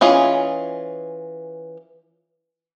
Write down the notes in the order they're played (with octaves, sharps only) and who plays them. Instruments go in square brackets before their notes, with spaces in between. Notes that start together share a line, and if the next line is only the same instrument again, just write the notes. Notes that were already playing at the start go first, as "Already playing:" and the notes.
[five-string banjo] E3 C#4 F4 G#4 D#5